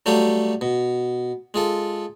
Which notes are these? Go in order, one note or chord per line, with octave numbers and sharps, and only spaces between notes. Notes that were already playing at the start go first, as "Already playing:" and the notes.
F#3 G3 A3 G4 A4 F5
B2
G#3 F4 A4